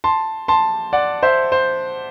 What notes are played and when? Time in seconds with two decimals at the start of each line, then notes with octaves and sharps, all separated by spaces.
0.04 A5 C6
0.48 A5 C6
0.93 D5 F#5
1.23 C5 E5
1.52 C5